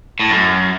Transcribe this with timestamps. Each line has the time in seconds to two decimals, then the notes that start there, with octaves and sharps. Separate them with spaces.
0.20 A2
0.30 F#2